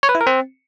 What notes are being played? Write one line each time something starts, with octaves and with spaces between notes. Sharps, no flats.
C#5
B4
E4
A#4
C4